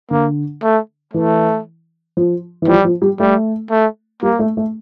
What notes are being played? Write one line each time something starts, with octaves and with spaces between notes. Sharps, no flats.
D3 A#3
A3
E3 A3
F3
E3
F3 G3
F3
G3
G3 A3
A3
G3 A#3
A3
A3